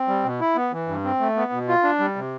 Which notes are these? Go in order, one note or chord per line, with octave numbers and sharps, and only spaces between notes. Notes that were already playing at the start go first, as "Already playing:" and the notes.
Already playing: C4
G3
B2
E4
B3
E3
G2
C4
A3
B3
B2
F4
D4
G3
C3